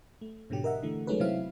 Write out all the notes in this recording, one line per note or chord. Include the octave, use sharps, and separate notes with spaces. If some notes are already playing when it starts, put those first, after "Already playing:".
A3
G#2 B2 D3 F#3 G4
A#4 D#5 E5 F#5
D3 E3 A3
F#3 G#3 A3 C#4 D#4 B4
C3 F#3 C4 E4 F5